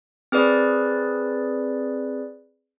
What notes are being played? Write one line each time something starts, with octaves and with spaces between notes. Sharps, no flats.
C4 G#4 B4 D5